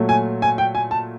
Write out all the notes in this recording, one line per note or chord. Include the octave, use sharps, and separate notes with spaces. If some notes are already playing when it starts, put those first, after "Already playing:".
Already playing: A#2 F#3 A3
G#5
G#5
G5
G#5
A5